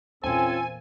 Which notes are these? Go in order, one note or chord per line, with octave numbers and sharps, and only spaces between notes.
E2 A#2 C4 C#4 F4 A4 C5 G#5